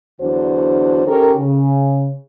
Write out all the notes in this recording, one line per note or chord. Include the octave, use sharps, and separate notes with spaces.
E2 D3 F#3 D4 F#4 C5
C#4 D#4 G4 A4 A#4
C#3